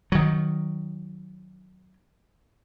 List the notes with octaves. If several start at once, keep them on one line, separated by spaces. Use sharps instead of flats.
D#3 F#3